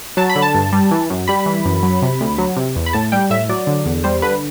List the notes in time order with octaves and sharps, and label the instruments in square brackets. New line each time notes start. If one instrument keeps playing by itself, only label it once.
[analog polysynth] F#3 A5
B5
D3
A5
G2
G3
E3
F#2
G3 B5
E3
F#2
F#3
C3
D2
F#3
C3
E2
B5
A2 A5
G3 G5
A2 E5
F#3 D5
D3
E2
G3 C5
D3 B4